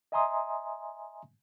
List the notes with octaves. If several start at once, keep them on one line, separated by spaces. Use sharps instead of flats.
D#5 E5 G#5 A#5 C6 D#6